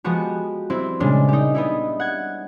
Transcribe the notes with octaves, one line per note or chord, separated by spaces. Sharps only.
F3 G#3 B3 F#4 G4
G3 C4 E4
A#2 C#3 G3 G#3 D4
D#4 G4
B3 D#4 E4
F#5 G#6